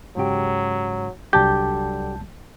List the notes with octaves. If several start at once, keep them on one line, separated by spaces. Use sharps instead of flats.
G#2 C#3 F#3 G4
C2 D3 F#3 G3 D4 G4 A5 G6